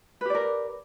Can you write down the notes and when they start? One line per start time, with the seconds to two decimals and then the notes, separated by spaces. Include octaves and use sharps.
0.21 B4
0.25 G4
0.30 D5
0.35 A#4